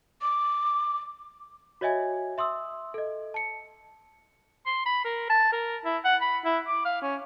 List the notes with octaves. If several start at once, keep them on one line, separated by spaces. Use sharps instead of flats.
D6
F#4 C#5 D#5 E5 G#5 G#6
E5 C6 D#6 E6
A4 D#5
A5 C#7
C6
B5
A#4
A5
A#4
E4
F#5
B5
E4
D6
F5
C#4